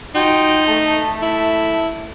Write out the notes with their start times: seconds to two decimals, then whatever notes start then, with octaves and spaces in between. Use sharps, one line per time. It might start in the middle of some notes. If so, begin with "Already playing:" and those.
0.15 D#4 F4 F#4 G5
0.67 A3 A5
1.22 E4